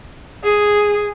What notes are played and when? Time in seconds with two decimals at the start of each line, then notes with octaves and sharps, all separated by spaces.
0.43 G#4